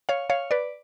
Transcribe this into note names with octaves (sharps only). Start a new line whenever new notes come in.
C#5 F5
C#5 F5
B4 D5